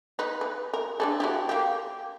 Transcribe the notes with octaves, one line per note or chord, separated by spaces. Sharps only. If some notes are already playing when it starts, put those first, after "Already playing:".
D#4 B4
B4
A#4
D4 G#4 A4
F#3 E4 G4
A#3 G4